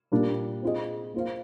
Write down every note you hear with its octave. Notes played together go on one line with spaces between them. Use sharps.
A#2 G3 A#3 D4
C4 F4 G#4 D#5
A#3 F4 C5 F5